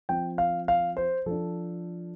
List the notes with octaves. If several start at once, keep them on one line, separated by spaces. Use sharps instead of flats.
F3 C4 G5
F5
F5
C5
F3 D4 A4